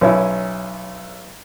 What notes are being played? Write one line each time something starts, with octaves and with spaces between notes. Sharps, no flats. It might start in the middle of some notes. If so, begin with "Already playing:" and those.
B1 C#4 E4